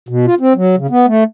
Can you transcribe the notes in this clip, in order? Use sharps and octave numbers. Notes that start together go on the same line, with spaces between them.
B2
F4
C4
F#3
C#3
B3
A3